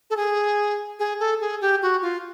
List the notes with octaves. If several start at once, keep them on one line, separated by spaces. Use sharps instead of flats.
A4
G#4
G#4
A4
G#4
G4
F#4
F4